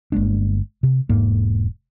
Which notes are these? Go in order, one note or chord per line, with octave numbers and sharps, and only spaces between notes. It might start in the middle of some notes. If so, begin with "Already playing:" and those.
G1 G#3 A#3 D4
C3
E1 G#2 A#3